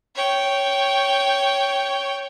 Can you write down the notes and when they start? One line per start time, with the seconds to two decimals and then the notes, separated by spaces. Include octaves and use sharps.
0.15 C#5 G5